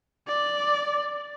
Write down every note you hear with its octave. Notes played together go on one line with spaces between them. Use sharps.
D5